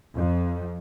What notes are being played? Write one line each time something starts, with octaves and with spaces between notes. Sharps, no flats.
F2